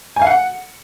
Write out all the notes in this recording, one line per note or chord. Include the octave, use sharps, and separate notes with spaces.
G#5
F5
F#5